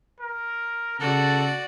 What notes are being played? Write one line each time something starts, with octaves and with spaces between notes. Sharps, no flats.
A#4
C#3 F#4 A4 D5